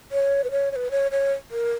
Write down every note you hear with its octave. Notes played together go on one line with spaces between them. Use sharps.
C#5
B4
C#5
C#5
B4
C#5
C#5
A#4